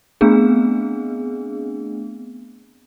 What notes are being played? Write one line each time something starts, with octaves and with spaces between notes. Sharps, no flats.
A3 B3 C4 D4 G#4